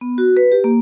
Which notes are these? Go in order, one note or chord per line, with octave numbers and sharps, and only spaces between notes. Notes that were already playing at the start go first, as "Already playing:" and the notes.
B3
F#4
B4
G4
A#3